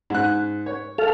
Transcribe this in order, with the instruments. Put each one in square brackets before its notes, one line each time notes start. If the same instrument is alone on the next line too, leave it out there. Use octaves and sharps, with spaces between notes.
[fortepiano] G#2 F#6
C#5
[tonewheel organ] A4 F5